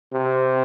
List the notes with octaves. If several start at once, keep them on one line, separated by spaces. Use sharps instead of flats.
C3